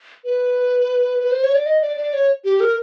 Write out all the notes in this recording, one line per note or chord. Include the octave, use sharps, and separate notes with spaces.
B4
B4
C5
C#5
D5
D#5
D5
D5
C#5
G4
A#4